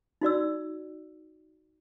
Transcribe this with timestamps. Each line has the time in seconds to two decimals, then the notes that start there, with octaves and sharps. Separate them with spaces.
0.21 D#4 F#4 D5 E6